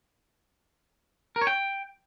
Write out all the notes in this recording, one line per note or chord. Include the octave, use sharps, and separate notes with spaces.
A#4
C#5
G5